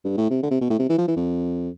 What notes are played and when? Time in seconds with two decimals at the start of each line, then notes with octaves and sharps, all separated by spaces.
0.04 G2
0.17 A2
0.30 C3
0.42 D3
0.51 C3
0.61 B2
0.70 A2
0.79 C3
0.89 E3
0.98 F3
1.08 E3
1.17 F2